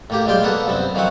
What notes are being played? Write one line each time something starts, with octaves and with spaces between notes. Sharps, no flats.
A2 A#3 G4
B1 G3 G#3 F4 G5
A#3 B3 A4 B4
C2 F#2 B3 C4
D#3 F3 F#3 C4 F#5